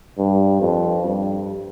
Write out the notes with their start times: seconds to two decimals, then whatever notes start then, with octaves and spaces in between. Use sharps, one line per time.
0.18 G2
0.61 F2
1.05 G2